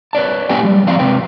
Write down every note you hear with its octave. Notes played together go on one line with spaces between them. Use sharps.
B4 C#5 D5 A5
A#3 C#4 G4 B4 G5 G#5
G3 G#3
F3 G3 C4 D5 F5 A#5
C3 G#3 C4 B4 G5